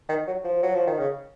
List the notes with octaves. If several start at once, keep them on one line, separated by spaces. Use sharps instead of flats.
D#3
F#3
F3
F#3
F3
D#3
C#3